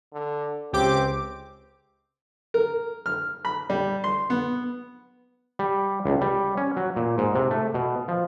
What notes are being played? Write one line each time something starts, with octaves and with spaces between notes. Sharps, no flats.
D3
C#2 C4 G4 D6
A#4
F6
B5
G3
C6
B3
G3
C#2
G3
C#4
F#3
A#2
G#2
C3
A3
B2
F3